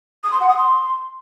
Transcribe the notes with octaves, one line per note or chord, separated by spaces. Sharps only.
D#6
C6
F#5
D#6
C6